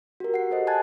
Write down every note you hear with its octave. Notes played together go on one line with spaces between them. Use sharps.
F#4 G4 A#4
F#5 C7
G4 A4 C5 D#5
G#5 A5 F#6 G#6 A6